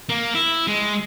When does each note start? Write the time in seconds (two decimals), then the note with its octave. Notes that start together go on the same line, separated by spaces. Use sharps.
0.09 A#3
0.35 E4
0.68 G#3